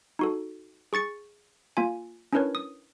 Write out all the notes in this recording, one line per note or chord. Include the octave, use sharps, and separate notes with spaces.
D#4 F#4 A4
G#4 C#6 A6 C#7
A#3 F4 G#5
C#4 D4 E4 A#4 B4 C#5
D#6